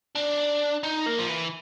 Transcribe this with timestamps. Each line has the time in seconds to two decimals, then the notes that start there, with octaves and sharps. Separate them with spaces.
0.16 D4
0.84 D#4
1.06 A#3
1.19 F3
1.29 E3